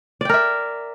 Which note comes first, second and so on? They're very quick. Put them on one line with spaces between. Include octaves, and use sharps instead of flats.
D5 G5 A#4 E5